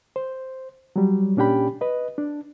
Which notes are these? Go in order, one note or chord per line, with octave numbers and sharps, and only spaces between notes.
C5
F#3 G3
A#2 C#4 D4 G4 G5 B5
B4 D#5
D4